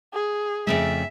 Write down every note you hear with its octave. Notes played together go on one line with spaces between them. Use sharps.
G#4
F2 C#3 A3 E5